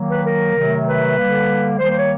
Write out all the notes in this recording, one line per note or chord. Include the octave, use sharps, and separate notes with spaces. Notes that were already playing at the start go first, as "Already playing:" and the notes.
Already playing: D#3 F#3 A#3
B4
A#4
C3 D#3 F#3 A3
B4
D3 G3 A#3
D#3 G3 A#3 C5
C5
C#5